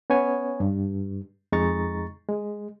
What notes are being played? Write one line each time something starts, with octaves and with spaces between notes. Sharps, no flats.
B3 C#4 C#5 G#5
G2
F2 G#3 D#4 A#5 C#6 A6
G#3